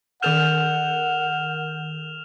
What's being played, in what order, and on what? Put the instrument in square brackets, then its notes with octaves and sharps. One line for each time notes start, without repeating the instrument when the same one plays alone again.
[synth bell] D#3 A#4 G6 [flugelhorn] F#5 [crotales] F6 E7 F7